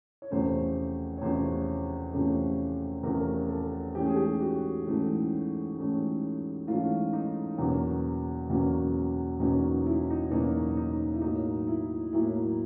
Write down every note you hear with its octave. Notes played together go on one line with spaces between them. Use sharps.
C#5
E2 C3 F3 A3 C#4 C5
C#5
E2 C3 F3 A3 C#4 C5
E2 C3 F3 A3 C#4
E2 C3 F3 A3 C#4 A#4
A4
G#2 E3 A3 C#4 G4
G#4
G4
F#4
G#2 E3 A3 C#4
G#2 E3 A3 C#4
G#2 E3 A3 C#4 F4
D#4
E2 B2 F#3 A#3 C#4
E2 B2 F#3 A#3 C#4
E2 B2 F#3 A#3 C#4 D#4
E4
D#4
D#4
E2 B2 F#3 A#3 C#4 D#4
D#4
E4
A2 F#3 A#3 D#4
E4
A2 F#3 A#3 E4